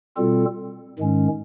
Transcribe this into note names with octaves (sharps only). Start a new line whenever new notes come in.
B2 G3 C4 F4 A4
G#2 D#3 G#3 C#4